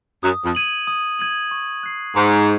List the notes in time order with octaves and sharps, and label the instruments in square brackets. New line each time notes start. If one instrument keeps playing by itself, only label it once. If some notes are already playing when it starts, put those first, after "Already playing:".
[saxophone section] F#2 [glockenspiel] D#6
[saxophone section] F2
[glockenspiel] G#6 D#7 F#7
D#6
G#6 D#7 F#7
C#6
F#6 C7
[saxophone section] G#2 [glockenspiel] C#6